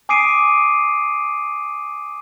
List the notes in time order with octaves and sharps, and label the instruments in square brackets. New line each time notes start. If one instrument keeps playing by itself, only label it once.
[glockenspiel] G#5 D6 D#6 C7 D7 D#7